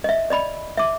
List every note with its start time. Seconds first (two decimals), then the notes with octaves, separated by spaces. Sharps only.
0.04 D#5 E5
0.30 D5 D#5 B5
0.77 E5 D6